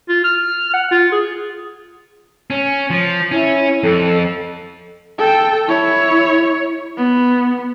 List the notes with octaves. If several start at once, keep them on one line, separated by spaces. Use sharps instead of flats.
F4
F6
F#5
F4
G#4
C#4
F3
C#4 E4
F2 A4
A4 G5
E4 C#5
B3